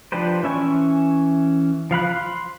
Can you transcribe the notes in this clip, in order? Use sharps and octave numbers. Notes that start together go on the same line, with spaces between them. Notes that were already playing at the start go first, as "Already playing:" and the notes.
F3 D4 G4 B4 C5
E3 C#4 E5 G#5 C#6
F3 F5 B5 F#6
C6